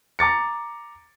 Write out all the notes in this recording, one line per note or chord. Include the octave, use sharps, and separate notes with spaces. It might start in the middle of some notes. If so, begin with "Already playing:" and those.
A#5 D6 A6 C#7